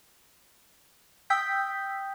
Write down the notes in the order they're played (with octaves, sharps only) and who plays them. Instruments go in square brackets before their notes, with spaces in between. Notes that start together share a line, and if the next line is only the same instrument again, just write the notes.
[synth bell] G5 D#6 E6 G6 B6